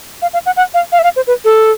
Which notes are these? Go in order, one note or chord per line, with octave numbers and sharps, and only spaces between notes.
F5
F5
F#5
F#5
F5
F5
E5
F5
C5
B4
A4